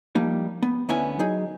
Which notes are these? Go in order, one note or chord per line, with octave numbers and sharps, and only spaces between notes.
F3 G3 A#3 D#4
B3
D2 D3 B3 C#4 E4 G#5
F#3 D#4 G#4